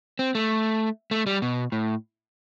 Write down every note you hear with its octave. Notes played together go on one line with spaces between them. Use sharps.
C4
A3
A3
G3
B2
A2